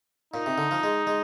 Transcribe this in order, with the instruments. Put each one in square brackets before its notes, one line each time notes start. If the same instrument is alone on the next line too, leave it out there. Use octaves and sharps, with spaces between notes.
[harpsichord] A#2 [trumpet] D#4
[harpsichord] C3
D3
F3
G#3
G#3